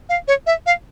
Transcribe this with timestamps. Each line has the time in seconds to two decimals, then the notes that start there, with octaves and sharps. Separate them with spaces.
0.09 F5
0.28 C#5
0.46 E5
0.66 F5